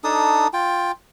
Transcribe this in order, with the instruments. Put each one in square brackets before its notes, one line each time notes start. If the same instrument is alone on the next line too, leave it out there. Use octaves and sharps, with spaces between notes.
[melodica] D4 D#4 A4 D#6
F4 G5